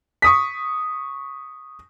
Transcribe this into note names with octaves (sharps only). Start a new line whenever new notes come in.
C#6 D#6 B6